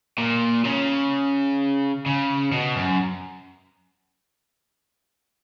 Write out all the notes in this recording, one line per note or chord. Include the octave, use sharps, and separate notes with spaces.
A#2
C#3
C#3
B2
F#2